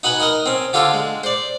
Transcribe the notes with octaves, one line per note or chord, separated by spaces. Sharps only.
D#4 F#4 B4 F#5 G#5
D#4 A#4 D#5
C4 C#4
D3 F4 G4 A4 C#5
G#3
C5 D5